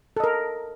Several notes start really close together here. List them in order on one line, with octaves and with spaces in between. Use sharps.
A4 D#5 A#4